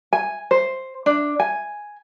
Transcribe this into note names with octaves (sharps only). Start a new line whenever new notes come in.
G#5
C5
D4
G#5